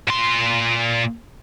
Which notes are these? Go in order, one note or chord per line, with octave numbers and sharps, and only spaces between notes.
A#2 C6